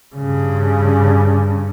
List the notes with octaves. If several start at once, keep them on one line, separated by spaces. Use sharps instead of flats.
G2 C#3